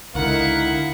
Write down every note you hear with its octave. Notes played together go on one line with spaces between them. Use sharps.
C#2 D3 D#4 E4 A#4 F5 F#5